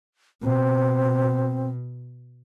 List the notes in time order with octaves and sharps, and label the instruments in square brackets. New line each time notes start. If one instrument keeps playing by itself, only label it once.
[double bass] B2 [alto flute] C4